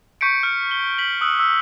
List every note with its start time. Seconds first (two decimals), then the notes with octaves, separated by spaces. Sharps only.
0.21 C#6 G6 B6 C#7 D7
0.43 F6
0.71 G7
0.99 B6 F#7
1.21 D#6 E6 F#6 F#7
1.40 E6